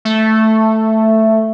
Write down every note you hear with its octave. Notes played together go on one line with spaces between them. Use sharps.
A3